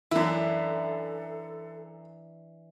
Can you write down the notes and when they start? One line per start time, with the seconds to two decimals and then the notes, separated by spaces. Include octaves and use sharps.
0.11 F#2 E3 D4 E4 A4